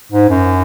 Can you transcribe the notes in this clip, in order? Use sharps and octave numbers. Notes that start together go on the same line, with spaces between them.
G#2
F#2